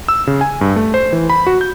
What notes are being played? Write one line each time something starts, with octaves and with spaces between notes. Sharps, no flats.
E6
C#3
G#5
G2
A3
C5
E3
B5
F#4
G6